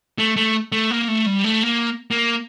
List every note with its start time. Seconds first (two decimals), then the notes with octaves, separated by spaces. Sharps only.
0.18 A3
0.36 A3
0.72 A3
0.91 A#3
1.08 A3
1.26 G3
1.44 A3
1.63 A#3
2.11 A#3